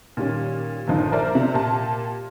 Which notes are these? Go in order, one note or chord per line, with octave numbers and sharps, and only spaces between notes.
A#2 D#3 G3 C#4
G1 A#2 F3 D#4
A#4 C5 D5 E5
C3
A#2 G4 A5